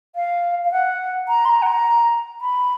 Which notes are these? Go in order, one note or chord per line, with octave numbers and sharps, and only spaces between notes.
F5
F5
F#5
A#5
C6
A#5
F#5
A#5
B5